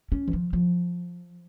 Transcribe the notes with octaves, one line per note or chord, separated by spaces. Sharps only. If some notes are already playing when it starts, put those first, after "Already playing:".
C#4
E3
F3
F3